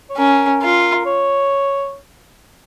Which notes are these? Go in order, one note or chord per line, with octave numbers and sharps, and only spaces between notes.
C#5
C#4 A#4
F4 A#4
C#5